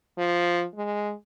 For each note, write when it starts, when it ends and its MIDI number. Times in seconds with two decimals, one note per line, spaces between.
0.18 0.64 53
0.75 1.12 56